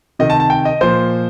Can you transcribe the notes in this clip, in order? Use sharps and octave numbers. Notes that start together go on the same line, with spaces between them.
C3 D#3 D#5
A5
A5
G5
D#5
A#2 F3 C5